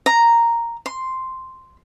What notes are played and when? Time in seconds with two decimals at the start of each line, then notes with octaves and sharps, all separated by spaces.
0.06 A#5
0.86 C6